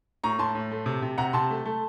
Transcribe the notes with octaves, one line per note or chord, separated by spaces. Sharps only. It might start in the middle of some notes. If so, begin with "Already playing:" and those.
A2 A#5 C#6
A2 A5 C6
A2
A3
C3
C3
C3 F#5 A#5
C3 A5 C6
A3
A3